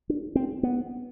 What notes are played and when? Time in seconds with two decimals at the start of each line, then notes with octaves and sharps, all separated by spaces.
0.09 D4
0.35 C4
0.63 B3